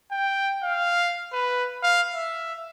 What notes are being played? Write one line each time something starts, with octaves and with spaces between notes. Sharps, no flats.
G5
F5
B4
F5
E5